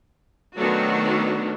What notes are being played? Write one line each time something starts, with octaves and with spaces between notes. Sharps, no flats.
D#3 F#3 A3 B3 D4 F#4